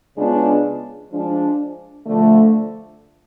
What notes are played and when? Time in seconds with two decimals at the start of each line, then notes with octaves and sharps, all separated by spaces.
0.17 C#3 G#3 B3 D4 F4
1.11 F3 G#3 D4
2.05 D3 F3 A3